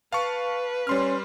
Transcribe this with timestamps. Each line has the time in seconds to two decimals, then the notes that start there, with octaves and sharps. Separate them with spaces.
0.12 B4 F5 A5 C#6
0.87 G3 C#4 C6 F6